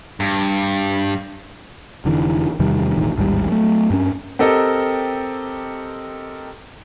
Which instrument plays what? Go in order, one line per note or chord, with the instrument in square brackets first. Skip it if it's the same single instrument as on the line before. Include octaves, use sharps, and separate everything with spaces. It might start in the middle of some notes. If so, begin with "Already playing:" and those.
[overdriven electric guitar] G2
[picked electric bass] F1 D3 E3
E2 C3 D#3 G3
E1 A1 D#3
A1 D#2 G#2 G3
F#3 A3
G2 C#4
[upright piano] C4 G4 A4 A#4 D#5